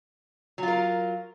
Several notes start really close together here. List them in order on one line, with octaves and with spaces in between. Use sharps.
F#3 F4 A#4